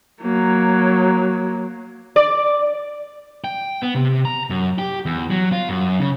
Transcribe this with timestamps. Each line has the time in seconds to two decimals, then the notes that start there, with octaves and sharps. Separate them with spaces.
0.22 F#3 A#3
2.16 D5
3.44 G5
3.82 B3
3.95 C3
4.25 A#5
4.50 F#2
4.78 G4
5.05 E2
5.30 F#3
5.52 F4
5.69 F#2
6.00 C#3